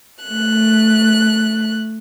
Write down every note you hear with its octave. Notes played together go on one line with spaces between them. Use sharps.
A3 F#6